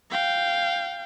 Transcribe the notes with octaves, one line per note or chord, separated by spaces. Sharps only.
F5 G5